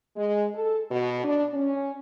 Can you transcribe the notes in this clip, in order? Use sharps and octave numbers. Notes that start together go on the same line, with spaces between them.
G#3
A4
B2
D4
C#4